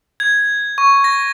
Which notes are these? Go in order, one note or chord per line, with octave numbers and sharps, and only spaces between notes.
G#6
C#6
A#6